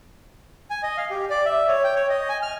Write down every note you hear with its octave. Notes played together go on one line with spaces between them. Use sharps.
G#5
D#5
F5
G4
D5
E5
C#5
G5
C#5
D#5
G#5
F6